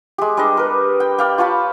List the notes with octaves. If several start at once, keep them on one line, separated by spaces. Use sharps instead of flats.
G#3 G4
G3 D4 D#5
A#4 B4
G5
D5 F5 G5
F4 C#5 A5 B5